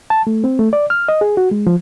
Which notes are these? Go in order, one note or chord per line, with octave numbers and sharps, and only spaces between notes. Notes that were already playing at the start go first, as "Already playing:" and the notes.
A5
A3
C4
A3
D5
F6
D#5
G#4
F#4
G#3
F3